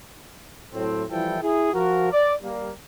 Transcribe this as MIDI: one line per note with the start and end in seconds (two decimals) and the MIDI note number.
0.73 1.03 45
0.73 1.03 54
0.73 1.03 60
1.10 1.37 52
1.10 1.37 53
1.10 1.37 55
1.10 1.37 64
1.10 1.37 69
1.10 1.37 79
1.41 1.70 64
1.41 1.70 68
1.72 2.09 53
1.72 2.09 66
1.72 2.09 70
2.11 2.33 74
2.42 2.70 55
2.42 2.70 58